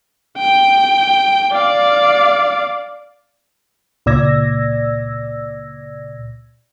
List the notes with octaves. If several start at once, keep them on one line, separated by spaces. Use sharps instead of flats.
G5
D5 F5
C#2 A#2 D5 E6 G#6 A#6